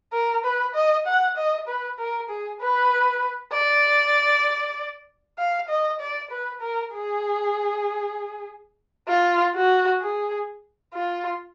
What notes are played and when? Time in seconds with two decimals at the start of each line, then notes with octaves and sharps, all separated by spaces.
0.13 A#4
0.44 B4
0.75 D#5
1.06 F#5
1.37 D#5
1.67 B4
1.99 A#4
2.30 G#4
2.61 B4
3.53 D5
5.38 F5
5.69 D#5
6.00 D5
6.31 B4
6.61 A#4
6.93 G#4
9.08 F4
9.55 F#4
10.02 G#4
10.94 F4